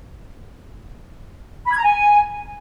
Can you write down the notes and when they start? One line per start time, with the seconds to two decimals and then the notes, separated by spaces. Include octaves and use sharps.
1.66 B5
1.72 G#6
1.77 A#5
1.83 G#5